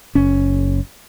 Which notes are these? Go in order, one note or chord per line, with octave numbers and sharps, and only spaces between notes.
F#1 C#4